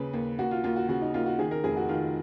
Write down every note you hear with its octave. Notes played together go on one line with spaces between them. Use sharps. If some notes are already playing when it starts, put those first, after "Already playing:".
Already playing: D#2 C#3 B4
D#2
D#2 F#4
F4
D#2 F4
F#4
C#3 F#4
D#4
D#2 F4
F#4
D#3 G#4
A#4
F1 G#4
F#4
D#3 F4